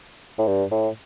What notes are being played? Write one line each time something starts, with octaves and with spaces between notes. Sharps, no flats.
A2
G2
A2